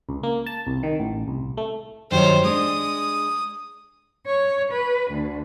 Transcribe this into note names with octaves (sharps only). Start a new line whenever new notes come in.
C#2
A#3
A5
C2
D#3
A1
C2
A3
G2 D#3 F#3 C5 C#5
G#3 D4 D#6
C#5
B4
D2